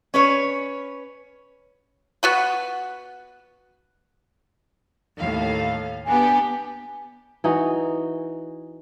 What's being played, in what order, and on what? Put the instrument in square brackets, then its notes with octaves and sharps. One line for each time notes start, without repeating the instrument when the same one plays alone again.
[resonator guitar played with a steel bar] C#4 B4 C#5
[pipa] B3 F#4 B4
[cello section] D#2 A2 F5
[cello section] B3 D4 G4 [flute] G#5
[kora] E3 D#4 F#4